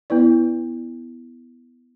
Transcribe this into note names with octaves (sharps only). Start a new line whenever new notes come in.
B3 E4 B4 D5